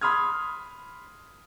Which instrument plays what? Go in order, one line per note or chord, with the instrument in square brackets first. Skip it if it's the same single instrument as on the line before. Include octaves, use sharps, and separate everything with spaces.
[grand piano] B5 C6 D#6 F6 G#6